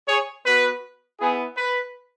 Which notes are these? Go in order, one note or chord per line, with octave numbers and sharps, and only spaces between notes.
G#4 C#5
B3 F#4 B4
B3 E4 G#4
B4